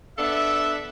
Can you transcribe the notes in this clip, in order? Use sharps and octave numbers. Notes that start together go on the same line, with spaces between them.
B3 D4 A4 E5